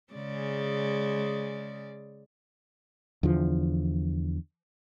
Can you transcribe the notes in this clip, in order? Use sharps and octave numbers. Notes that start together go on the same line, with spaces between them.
C#3 G#3 D5
E2 D3 F3